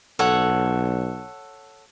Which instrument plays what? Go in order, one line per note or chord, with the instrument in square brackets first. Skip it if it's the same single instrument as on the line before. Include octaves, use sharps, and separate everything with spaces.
[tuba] B1 [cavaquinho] A4 C#5 F#5